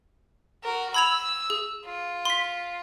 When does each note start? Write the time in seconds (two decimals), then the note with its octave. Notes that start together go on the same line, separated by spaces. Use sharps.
0.64 F#4 A#4
0.94 B5 E6 G#6 F7
1.50 G#4
1.85 F4
2.25 C6 B6